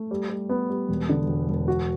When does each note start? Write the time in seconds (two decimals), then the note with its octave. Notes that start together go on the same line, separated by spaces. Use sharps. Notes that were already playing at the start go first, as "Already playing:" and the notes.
Already playing: A3
0.11 G3
0.29 G3
0.49 B3
0.70 G3
0.89 E1
1.09 D3
1.28 E1
1.49 E1
1.68 F#4